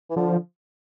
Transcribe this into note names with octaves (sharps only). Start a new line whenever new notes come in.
E3
D3 F3